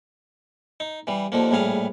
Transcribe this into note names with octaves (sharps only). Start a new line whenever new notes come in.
D#4
E3 G3
D#2 D3 F3 A#3
A#1 A2 G3 G#4 F5